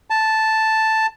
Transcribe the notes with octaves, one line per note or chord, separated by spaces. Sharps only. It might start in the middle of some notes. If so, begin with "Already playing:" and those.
A5